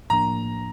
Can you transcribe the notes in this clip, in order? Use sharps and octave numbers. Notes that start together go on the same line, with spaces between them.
A2 F3 A#3 D4 A#5